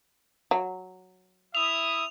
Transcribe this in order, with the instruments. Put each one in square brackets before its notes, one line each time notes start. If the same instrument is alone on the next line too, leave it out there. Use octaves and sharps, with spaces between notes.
[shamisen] F#3
[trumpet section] E4 E5 D#6 [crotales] F7